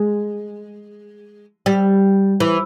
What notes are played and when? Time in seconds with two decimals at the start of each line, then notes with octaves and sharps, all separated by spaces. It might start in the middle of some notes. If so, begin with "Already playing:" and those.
Already playing: G#3
1.66 G3
2.40 E3